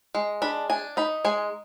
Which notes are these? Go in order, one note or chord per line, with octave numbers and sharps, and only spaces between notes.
G#3
D4 B5
D4 G#5
D#4 B5
G#3 G#5